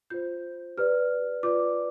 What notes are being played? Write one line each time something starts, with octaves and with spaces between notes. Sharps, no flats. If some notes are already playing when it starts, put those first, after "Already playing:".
F4 C5 G6
G4 B4 D5 F6
F4 B4 D5 D6